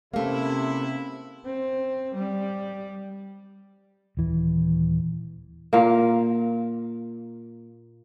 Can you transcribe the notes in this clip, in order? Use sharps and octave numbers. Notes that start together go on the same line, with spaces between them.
C3 A3 A#3 C#4 E4 F5
C4
G3
D#1 E3
A#2 A#3